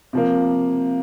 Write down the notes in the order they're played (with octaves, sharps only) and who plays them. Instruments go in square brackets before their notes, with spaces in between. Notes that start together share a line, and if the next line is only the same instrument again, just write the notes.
[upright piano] C3 F3 A#3